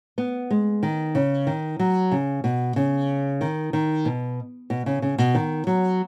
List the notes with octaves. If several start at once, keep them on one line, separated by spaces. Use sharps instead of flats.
B3
G#3
D#3
C#3
D#3
F#3
C#3
B2
C#3
D#3
D#3
B2
B2
C#3
C#3
B2
D#3
F#3